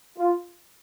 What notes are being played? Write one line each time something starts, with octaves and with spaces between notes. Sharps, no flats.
F4